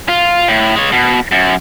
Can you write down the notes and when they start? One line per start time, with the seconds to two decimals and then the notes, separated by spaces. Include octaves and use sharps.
0.09 F4
0.48 A2
0.76 G#3 C#5
0.92 B2
1.31 F#2